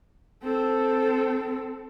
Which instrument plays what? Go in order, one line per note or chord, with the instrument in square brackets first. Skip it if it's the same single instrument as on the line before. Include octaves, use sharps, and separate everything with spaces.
[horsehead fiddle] C4 A4